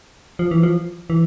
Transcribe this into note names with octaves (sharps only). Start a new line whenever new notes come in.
F3
E3
F3
E3